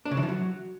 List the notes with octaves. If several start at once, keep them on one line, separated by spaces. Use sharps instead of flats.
D4
C#3
E3
F3
F#3